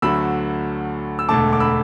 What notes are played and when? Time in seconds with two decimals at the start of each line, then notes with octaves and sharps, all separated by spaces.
0.02 D2 D3 F#3 A3 B5 E6
1.19 E6
1.29 E1 D2 D3 A3 A5 D6
1.53 D6
1.60 B5 E6